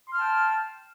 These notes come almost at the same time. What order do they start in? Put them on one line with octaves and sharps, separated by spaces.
C6 F6 A5 G5